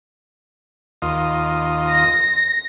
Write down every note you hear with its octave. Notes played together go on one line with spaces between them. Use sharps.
D#2 F4 D#5
A#6